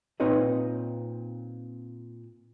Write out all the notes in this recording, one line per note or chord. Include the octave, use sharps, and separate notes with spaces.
A#2 C4 D#4 B4 C#5 D#5